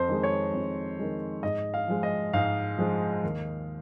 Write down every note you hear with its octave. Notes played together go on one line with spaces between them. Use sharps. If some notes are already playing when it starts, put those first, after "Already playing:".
Already playing: F2 C5
D#3 G#3
C#5
F2
D#3 G#3
G#2 D#5
F5
F3 G#3
D#5
G#2 F5
F3 G#3
D#2